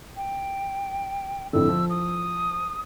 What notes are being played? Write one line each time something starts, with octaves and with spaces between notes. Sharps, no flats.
G5
F2 A2 D3 E6
F3
D#6